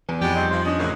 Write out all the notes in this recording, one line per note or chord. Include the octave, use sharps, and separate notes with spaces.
E2 E3
F2 B2 G#3 G4 D5
G3 C4 D#4
F3 C5
C#4 D4 D#5
A1 F#2 C#3 D#4